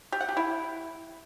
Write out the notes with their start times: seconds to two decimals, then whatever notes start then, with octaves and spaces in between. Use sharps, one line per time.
0.12 G4
0.21 F#5
0.29 G4
0.37 E4